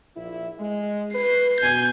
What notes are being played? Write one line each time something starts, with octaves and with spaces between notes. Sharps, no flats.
A#1 E4
G#3
B4 C7
B2 G#5 G6